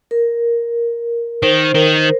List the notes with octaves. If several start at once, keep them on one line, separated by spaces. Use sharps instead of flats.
A#4
D#3 C5
D#3 A#4